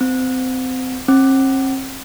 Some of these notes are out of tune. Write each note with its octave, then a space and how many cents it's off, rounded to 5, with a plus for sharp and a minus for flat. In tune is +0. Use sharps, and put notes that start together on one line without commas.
C4 -25
C4 +40